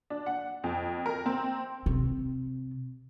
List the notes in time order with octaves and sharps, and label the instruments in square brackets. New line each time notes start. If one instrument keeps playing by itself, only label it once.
[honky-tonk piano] D4
F#5
F2
A#4
C4
[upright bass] C3